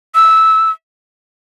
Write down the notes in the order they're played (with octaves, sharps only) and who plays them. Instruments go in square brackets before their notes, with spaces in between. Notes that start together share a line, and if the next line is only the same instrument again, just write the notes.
[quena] E6